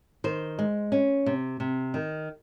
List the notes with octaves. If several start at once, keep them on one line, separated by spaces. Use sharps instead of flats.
D#3 C5
G#3
C#4
C3
C3
D#3